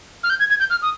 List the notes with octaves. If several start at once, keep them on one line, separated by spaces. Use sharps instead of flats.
F6
G6
G#6
G#6
G6
F6
D#6